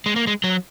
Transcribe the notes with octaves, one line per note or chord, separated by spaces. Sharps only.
G#3
A#3
G#3
F#3